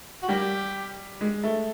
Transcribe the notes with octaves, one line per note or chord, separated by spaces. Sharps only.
F#4
G3 A#3 G4
G#3
A3